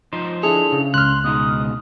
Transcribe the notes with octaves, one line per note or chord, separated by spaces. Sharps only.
F3 D#4 C5
D4 E4 G#4 A4 F7
C#3
C#2 C6 F6 F#6
B2 G#3 D#4 D#6